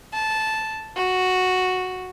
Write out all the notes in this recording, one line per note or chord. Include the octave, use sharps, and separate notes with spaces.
A5
F#4